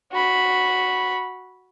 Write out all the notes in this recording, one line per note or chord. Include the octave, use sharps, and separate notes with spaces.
F#4 B5